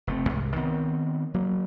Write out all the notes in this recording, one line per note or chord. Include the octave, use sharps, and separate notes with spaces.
F1 A3 C4
C2 G#2 C3
D#3 B3 C4
F#3 A#3